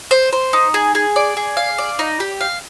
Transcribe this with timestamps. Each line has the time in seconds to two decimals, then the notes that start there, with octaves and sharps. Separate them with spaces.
0.11 C5
0.33 C5
0.53 D#4
0.74 G#4
0.95 G#4
1.16 D5
1.37 G#4
1.57 F5
1.78 D5
1.99 D#4
2.20 G4
2.41 F5